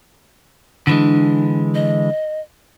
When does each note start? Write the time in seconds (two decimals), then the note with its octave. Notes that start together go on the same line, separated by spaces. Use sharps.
0.87 D3 E3 G#3 D4
1.75 D#5